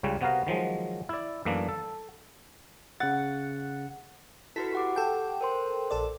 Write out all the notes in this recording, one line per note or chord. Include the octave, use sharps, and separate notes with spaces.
C#2 C#3 G3 C#5
C3 B3 F#4 A#4 F5
D#3 F3 F#3 G#3
E4 D5
F#2 E3 A3 A#3 D4
A4
C#3 F#5 A6
E4 F#4 A4 B4 B6
G4 F#5 D6
A4 G5
A#4 C5 C6
A#1 A4 D5